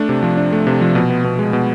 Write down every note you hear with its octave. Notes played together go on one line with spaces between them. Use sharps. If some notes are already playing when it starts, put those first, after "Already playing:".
Already playing: A3 D4
C3
F3
D4
A3
C3
F3
B2
B3
B2
G#3
B2